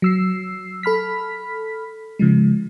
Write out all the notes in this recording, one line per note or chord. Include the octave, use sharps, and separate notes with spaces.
F#3 E6 C7
A4 B5 F6 B6
C#3 F3 G#3